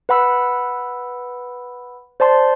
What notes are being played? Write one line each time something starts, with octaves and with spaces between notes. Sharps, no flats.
B4 F#5 B5 E6
C5 D5 A5 C6